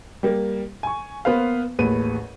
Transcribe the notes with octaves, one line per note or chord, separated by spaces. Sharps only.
G3 A#3
G#5 C#6
A#3 B3 B4 C5 F5
A1 D#2 G#4 B4 D#7